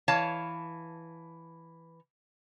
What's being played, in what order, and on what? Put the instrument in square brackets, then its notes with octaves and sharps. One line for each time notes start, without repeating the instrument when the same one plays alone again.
[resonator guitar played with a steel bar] E3 C#5 F5 A5